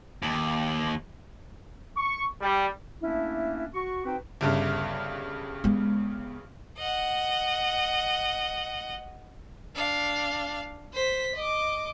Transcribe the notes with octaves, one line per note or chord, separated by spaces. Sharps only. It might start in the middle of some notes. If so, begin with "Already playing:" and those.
D#2
C#6
G3
A3 A#3 C#4 D4 E4
F#4 C#6
C4 D#4 F#4 B4 G5
G1 G2 C#3
G#3 B3
D#5 F#5
D4 F5
C5 B6
D#5 D6